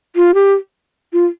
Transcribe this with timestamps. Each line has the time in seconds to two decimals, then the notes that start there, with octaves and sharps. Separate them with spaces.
0.16 F4
0.34 G4
1.13 F4